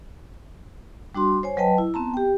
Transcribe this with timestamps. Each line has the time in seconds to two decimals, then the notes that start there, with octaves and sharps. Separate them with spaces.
1.15 G3 D4 F#4 C6
1.43 C5 C#5 G#5
1.57 F#3 B4 D#5 G5 A5
1.78 E4
1.94 B3 C4 A5 A#5
2.14 G4 G5